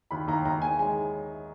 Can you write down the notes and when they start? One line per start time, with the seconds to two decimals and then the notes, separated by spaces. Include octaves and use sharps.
0.11 D#2 B5
0.28 D#2 A#5
0.45 D#2 A#5
0.62 D#2 G#5
0.79 G#3 G#5